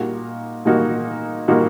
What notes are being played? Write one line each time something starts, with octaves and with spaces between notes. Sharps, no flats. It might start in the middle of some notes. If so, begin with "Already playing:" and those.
Already playing: A#2 G3 A#3 D#4 F#4
A#2 G3 A#3 D#4 F#4
A#2 G3 A#3 D#4 F#4